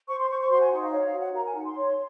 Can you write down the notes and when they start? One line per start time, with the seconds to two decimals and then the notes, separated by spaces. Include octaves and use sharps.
0.09 C5 C#6
0.20 C6
0.29 C5 C#6
0.41 C#6
0.50 F#4 C6
0.61 G#5
0.71 D#4 F#5
0.82 F5
0.92 C#5 F5
1.06 F5
1.12 F#4
1.20 F#5
1.34 A#4 A#5
1.44 G#5
1.55 D#4 F#5
1.65 C6
1.76 C#5